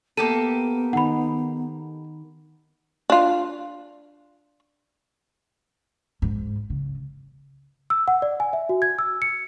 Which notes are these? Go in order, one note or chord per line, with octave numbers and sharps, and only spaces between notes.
A#3 B3 G4 A4 D#7
D#3 D#4 F#5 B5
D4 F4
G#2
C#3
E6
F#5
D5
G#5
E5
F#4
G#6
E6
C#7